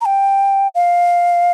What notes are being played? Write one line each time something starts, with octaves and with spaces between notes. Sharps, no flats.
A#5
G5
F5